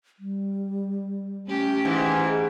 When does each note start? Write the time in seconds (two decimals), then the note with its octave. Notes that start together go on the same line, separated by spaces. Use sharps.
0.19 G3
1.47 A3 C#4 G4
1.85 G#2 E3